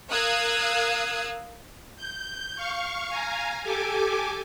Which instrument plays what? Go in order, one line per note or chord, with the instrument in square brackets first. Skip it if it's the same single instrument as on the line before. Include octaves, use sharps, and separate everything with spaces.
[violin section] A#4 F5 D#6 E6 F#6 G#6
[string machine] G6
F5 C#6
F5 G#5 A#5
G4 A4 G#5 D6